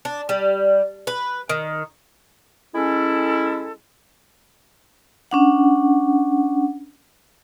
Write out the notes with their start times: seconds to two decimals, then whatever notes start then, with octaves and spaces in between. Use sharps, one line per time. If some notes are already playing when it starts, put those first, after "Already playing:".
0.05 D4
0.29 G3
1.07 B4
1.49 D#3
2.75 G#3 C#4 E4 A4
5.31 C#4 D4 F#5